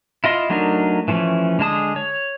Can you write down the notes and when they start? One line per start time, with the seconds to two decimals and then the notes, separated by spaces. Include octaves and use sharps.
0.24 E4 F4 D#5 C6
0.50 F#3 A3 D4 D#4 A#4
1.08 E3 F3 A3 C#4
1.59 D3 G#3 A5 D#6
1.96 C#5